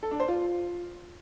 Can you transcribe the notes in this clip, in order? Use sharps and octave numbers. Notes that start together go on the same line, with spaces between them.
A4
D4
C5
F4